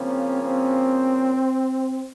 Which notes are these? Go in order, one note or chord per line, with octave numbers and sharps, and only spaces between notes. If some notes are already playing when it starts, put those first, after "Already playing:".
Already playing: C#3 F3 A#3 C4 C#4
C4